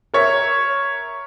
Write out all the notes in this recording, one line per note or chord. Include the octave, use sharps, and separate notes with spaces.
A#4 C#5 E5